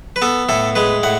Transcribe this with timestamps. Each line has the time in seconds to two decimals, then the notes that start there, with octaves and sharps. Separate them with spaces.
0.16 B4
0.22 B3 A4
0.49 A2 A4
0.75 G#3 B4
1.03 A2 F#5